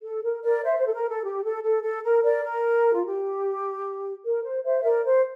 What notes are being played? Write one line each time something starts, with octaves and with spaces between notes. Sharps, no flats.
A4
A#4
A#4 D5
C5 E5
C5
A4
A#4
A4
G4
A4
A4
A4
A#4
A#4 D5
A#4
F4
G4
A#4
C5
C5 E5
E5
A#4 D5
C5